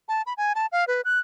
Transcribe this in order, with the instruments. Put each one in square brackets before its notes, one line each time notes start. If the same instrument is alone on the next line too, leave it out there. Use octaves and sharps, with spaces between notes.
[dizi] A5
B5
G#5
A5
F5
B4
F#6